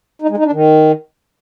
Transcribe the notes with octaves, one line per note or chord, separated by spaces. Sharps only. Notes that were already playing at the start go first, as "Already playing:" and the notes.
D#4
G#3
D#4
D4
D#3